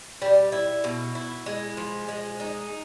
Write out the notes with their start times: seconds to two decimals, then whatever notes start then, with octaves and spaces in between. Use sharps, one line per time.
0.22 G3
0.52 E4
0.84 B2
1.15 E4
1.46 G#3
1.77 F3
2.08 G#3
2.40 D#4